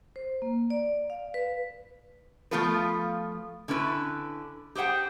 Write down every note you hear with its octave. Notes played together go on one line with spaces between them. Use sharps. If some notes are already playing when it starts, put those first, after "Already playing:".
C5
A#3
D5
F5
B4
F3 A3 B3 F4 A4 B4
D3 C#4 E4 B4
G4 G#4 C5 F#5 G5